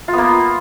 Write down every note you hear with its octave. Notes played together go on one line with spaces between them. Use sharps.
F4
B3
A#3